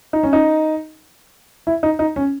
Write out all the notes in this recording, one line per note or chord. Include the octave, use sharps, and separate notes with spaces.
D#4
C#4
D#4
E4
D#4
D#4
C#4